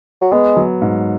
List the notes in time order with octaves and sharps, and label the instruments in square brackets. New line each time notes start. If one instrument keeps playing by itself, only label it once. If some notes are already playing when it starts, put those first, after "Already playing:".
[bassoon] F#3
[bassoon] G#3 [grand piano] B3
[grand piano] F#3
G#2